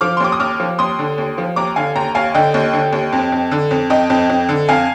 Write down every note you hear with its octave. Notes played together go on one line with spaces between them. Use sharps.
F3 D6 F6
C6
D#2 D6
D#6
D#2 D6 F6
F3
D#2 C6 D#6
D3
D#2
F3
D#2 A#5 D6
D3 F5 G#5
D#2 G5 A#5
D#2 F5 G#5
D3 D#5 G5
D#2
D3
D#2
F2
F2
D3
F2
F2 D#5 G5
F2
F2
D3
F2 F5 G#5